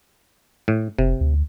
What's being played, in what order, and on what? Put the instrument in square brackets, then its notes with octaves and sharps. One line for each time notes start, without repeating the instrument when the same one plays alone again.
[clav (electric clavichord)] A2
[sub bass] F1 [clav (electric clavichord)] C3
[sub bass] D2